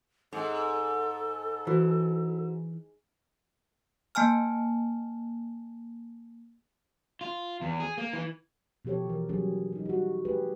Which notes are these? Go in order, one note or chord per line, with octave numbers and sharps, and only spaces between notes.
G#2 A4
E3 F#4 C5
A#3 G#5 A5 F6
F4
E2
G#4
A#3
E3
B2 F3 G4 A4 C#5
E3 A#4
F#3 G3 C#4 G#4
G3 D#4
G3 F#4
A3 G4 G#4 B4